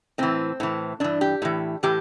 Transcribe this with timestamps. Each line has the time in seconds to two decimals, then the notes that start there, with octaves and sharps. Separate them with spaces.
0.18 A2 E3 C4
0.60 A2 E3
1.00 G2 E3 D4
1.21 G4
1.42 A2 E3
1.83 A2 E3 G4